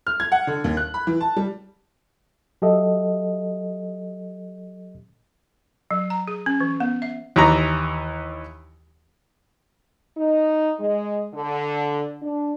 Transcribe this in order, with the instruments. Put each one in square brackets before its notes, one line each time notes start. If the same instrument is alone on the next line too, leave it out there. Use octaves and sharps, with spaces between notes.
[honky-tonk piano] F6
G#6
F#5
D3
D#2
F#6
B5
E3
A5
G3
[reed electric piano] F#3 G4 A4 D#5 E5
[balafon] F#3
A#5
G#4
C#4
E3
B3
E5
[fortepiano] D#2 E3 A#5
[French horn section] D#4
G#3
D3
D4